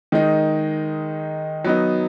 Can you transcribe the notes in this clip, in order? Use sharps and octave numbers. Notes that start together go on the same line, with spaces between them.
D#3 G#3 D#4
F#3 B3 D#4